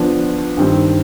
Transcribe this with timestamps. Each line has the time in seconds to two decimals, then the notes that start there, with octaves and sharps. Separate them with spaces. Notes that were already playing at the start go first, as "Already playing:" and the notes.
Already playing: F3 B3 D4
0.57 G2 D#3 G3 C4